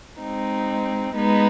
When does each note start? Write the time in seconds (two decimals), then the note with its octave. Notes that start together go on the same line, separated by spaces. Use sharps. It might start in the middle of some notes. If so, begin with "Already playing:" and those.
0.21 G#3 C4 D#4
1.15 G#3 B3 D#4